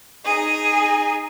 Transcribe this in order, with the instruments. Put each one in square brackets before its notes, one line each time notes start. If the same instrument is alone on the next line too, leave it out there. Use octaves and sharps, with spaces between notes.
[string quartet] D#4 G#4